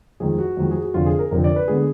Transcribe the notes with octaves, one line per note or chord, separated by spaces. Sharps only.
F2 D#3 G#3 G#4
F#4
F2 D#3 G#3
G#4
F#4
F1 F2 D3 F4
G#4
A#4
F1 F2 D3 A#4
D5
B4
D3 G#3 B3 G#4